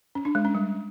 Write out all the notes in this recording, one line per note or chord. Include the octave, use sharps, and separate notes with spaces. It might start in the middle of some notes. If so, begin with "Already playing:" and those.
C#4
D4
G#3
C#4
G3